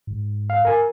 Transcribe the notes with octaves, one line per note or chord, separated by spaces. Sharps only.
G#2
F5
A#4 G#5